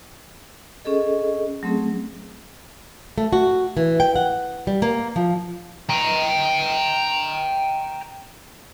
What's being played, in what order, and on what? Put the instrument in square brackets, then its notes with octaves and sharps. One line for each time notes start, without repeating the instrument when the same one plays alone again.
[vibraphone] C#4 G#4 A4 D#5
F#3 A3 C4 C#4 G#4
[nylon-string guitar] A3
F#4
E3
G5
F#5
G3
A#3
F3
[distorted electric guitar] G5 A#5